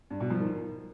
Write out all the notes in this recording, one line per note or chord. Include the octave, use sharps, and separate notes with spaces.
G2
B2
F3
D#3